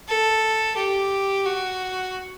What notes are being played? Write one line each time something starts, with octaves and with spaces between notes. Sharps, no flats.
A4
G4
F#4